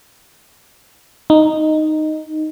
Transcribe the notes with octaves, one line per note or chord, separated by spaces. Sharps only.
D#4